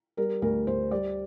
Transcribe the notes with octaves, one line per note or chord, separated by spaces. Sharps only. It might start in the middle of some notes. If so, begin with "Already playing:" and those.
G3 A#4
D2 A#4
D2 C5
G3 D5